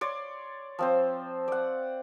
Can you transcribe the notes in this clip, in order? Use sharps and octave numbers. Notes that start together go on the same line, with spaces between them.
C#5 D5 C6
F3 C4 C5
D5 F#5